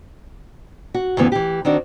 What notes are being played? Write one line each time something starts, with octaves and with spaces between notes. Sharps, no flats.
F#4
D2 G2 C#3 E3 B3
E3 G4
D#3 C4 D4 F#4